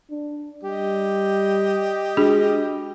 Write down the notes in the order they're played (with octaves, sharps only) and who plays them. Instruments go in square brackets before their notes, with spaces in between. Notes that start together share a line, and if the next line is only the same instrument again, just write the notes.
[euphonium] D4
[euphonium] G3 [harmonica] G4 D#5
[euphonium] G#3 [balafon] D4 F#4 G#4